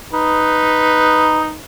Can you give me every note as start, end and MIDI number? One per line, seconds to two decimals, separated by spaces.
0.13 1.56 63
0.13 1.56 71